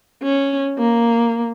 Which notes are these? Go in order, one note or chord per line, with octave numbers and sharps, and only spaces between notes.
C#4
A#3